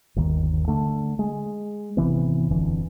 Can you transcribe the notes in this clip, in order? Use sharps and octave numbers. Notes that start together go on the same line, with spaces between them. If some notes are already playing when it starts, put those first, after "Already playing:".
G1 D#2 D#3
D3 A3
G#3
G#1 C3 E3 B3
D#1 F2 D3 E3